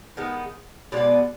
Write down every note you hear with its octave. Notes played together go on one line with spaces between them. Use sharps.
D#3 G#3 B3
B2 G#3 B3 D5